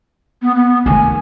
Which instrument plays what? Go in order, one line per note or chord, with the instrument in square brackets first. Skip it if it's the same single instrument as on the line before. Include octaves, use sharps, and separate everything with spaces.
[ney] B3
B3
[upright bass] D#3 A3 [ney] G#5